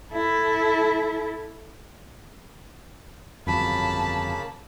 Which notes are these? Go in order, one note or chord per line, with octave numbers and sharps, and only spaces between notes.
E4 A4
G1 F2 C#3 F#3 A#3 A5 B5